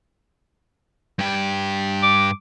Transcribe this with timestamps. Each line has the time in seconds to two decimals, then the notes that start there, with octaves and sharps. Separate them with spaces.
1.19 G2 G4
2.03 D6